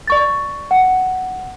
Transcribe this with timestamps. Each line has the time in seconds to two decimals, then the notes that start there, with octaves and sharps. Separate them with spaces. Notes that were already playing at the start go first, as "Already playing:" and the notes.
0.08 D5 C#6 A6
0.71 F#5